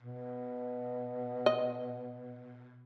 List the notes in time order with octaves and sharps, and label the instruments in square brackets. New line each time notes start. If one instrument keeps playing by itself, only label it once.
[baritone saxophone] B2
[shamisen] D#5